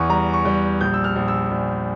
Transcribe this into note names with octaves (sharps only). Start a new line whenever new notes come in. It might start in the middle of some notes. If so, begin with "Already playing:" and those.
Already playing: E2 E3 C#6
G3 A#5
C#6
G3
A#1 G6
E6
F6
A#1
E6
A#1